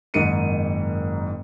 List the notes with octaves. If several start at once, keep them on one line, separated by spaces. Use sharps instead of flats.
F#1 G#2 D#3 C#7 D#7